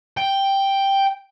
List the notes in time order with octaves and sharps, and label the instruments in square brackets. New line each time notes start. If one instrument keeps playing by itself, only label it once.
[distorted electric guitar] G5